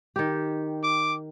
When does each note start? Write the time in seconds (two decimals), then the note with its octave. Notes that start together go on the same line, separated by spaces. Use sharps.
0.16 D#3 G4
0.83 D6